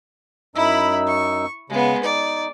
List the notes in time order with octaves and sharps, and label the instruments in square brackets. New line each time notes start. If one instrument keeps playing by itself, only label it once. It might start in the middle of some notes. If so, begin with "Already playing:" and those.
[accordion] F#2 D#4 E6 [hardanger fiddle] E4 B5
[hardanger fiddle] C#6
[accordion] C#3 [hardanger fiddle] G#3 B3
[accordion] D#4 [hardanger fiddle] D5